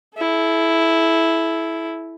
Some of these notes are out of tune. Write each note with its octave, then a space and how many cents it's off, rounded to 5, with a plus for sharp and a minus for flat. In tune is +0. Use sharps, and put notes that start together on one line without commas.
E4 +0 A4 -40